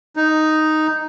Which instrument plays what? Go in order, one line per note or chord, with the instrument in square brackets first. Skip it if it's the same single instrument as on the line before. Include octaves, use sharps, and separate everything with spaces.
[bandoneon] D#4